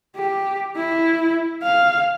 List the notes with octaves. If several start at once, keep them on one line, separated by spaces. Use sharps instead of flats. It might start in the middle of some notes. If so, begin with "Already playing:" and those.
G4
E4
F5